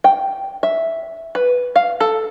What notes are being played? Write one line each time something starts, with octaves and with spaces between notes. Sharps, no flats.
G5
E5
B4
F5
A4